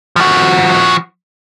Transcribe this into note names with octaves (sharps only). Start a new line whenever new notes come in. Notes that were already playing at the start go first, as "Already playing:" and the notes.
F3 F#4